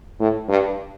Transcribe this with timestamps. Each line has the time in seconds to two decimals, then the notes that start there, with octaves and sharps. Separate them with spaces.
0.20 A2
0.49 G2